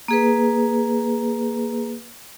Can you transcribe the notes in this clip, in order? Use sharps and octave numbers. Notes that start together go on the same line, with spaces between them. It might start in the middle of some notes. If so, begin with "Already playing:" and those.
A#3 G#4 B4